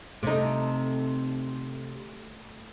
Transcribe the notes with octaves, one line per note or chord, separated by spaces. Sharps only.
C3 A3 D#4 A4